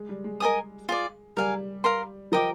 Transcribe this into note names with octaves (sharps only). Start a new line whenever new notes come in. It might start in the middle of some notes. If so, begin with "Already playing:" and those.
Already playing: G#3
G3
G#3
A#4 D#5 G#5 D#6
F4 G#4 D5
G3 A#4 F5 G#5
A#4 F5 C6
F3 A#4 D#5 G5 D6